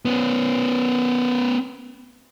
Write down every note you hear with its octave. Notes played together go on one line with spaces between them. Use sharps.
B3 C#4